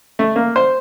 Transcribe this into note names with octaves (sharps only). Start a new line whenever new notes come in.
A3
A#3
C5